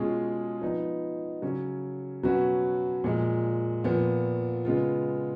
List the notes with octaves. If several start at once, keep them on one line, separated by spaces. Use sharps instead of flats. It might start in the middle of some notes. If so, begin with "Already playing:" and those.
Already playing: B2 G#3 C#4 F4 G#4
F3 B3 D#4
C#3 F#3 C#4
B2 F#3 C#4 F#4 B4
A#2 F3 G#3
A#2 F3 B3
C#3 G#3 B3 F4